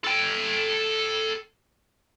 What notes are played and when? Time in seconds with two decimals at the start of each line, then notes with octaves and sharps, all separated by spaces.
0.04 A4 G5